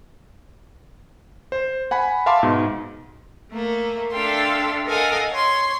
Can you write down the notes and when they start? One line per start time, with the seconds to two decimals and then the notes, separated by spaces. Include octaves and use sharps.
1.52 C5
1.91 F#5 G#5 B5
2.26 E5 F5 A5 B5 C6 D6
2.43 G#2 B2
3.52 A3 A#3
4.11 D4 A4 E5 F5 G5 C6
4.87 A4 A#4 D#5 F5 F#5 G#5
5.32 C#5 C6